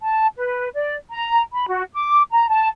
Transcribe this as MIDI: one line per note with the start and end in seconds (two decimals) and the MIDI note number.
0.01 0.28 81
0.38 0.69 71
0.74 0.96 74
1.10 1.41 82
1.53 1.66 83
1.68 1.84 66
1.93 2.21 86
2.31 2.47 82
2.48 2.68 81